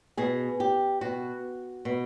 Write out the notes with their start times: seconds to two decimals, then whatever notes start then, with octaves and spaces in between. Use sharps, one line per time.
0.17 B2 G#4
0.60 G4
1.01 B2 F#4
1.85 B2